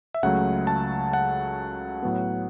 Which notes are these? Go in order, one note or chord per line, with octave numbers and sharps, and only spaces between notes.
E5
C#2 C#3 F#3 A3 F#5
A5
F#5
A2 F#3 B3